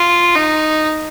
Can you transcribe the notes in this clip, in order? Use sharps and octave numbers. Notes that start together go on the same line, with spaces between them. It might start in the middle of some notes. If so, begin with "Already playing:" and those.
Already playing: F4
D#4